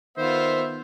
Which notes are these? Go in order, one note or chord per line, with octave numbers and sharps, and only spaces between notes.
D#3 B3 F4 C5 E5